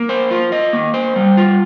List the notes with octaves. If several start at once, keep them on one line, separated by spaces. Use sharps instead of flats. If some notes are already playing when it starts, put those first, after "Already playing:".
Already playing: A#3
C5
F4
D#5
A#3
C5
G3
F4